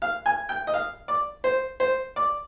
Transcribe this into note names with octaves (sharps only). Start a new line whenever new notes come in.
F5
G#5
G5
D#5
F5
D5
C5
C5
D5